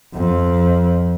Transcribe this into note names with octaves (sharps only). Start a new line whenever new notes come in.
F2